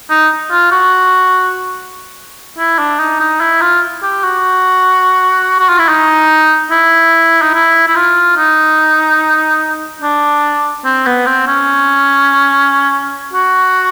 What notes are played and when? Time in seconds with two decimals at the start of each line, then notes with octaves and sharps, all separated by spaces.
0.10 D#4
0.51 F4
0.72 F#4
2.58 E4
2.79 D4
2.99 D#4
3.20 D#4
3.41 E4
3.61 F4
4.03 G4
4.24 F#4
5.59 F#4
5.69 F4
5.79 E4
5.89 D#4
6.71 E4
7.42 D#4
7.54 E4
7.88 E4
7.96 F4
8.37 D#4
10.02 D4
10.85 C4
11.06 B3
11.26 C4
11.47 C#4
13.33 F#4